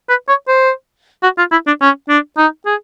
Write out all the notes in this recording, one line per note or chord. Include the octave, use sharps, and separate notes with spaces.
B4
C#5
C5
F#4
F4
E4
D4
C#4
D4
D#4
G#4